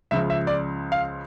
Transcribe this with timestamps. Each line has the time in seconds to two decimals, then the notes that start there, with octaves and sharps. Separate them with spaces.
0.11 C#2 C#3 F3 E5
0.30 E5
0.47 D5
0.92 F5